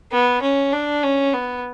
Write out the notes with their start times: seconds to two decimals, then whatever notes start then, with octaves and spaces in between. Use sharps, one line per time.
0.12 B3
0.42 C#4
0.73 D4
1.03 C#4
1.33 B3